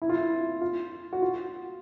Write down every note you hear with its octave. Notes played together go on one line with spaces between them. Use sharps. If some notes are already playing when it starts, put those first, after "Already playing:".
E4
F4
E4
F4
F#4
F4